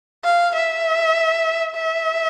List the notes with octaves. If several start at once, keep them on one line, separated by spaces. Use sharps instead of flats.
F5
E5
E5